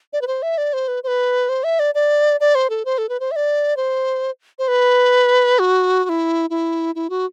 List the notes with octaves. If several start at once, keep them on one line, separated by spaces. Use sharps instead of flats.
D5
B4
C5
E5
D5
C5
B4
C5
B4
C5
E5
D5
D5
D5
C5
A4
C5
A4
B4
C5
E5
D5
C5
C5
B4
F#4
F#4
E4
E4
E4
F#4